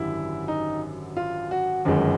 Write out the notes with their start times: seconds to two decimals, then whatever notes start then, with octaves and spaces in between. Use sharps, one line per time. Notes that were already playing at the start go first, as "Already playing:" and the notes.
Already playing: G#1 F#2 D3 G3 E4
0.48 D#4
1.17 F4
1.51 F#4
1.85 G1 F#2 D#3 G#3 F#4